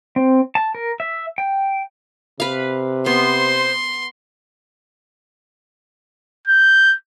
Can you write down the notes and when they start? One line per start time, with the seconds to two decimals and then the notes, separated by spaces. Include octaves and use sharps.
0.16 C4
0.55 A5
0.75 A#4
1.00 E5
1.38 G5
2.40 C3 B4 F5
3.06 B3 C5 C6
6.48 G6